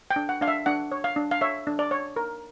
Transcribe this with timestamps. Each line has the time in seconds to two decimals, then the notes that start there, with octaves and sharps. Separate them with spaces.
0.10 G5
0.16 D4
0.29 F#5
0.41 D4 F5
0.48 E5
0.66 D4 F#5
0.92 C#5
1.04 F5
1.16 D4
1.31 F5
1.41 C#5 E5
1.67 D4
1.79 D5
1.91 C#5
2.16 A#4